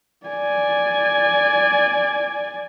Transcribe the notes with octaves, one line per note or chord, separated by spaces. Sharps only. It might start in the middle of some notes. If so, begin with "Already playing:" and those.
D5 G#5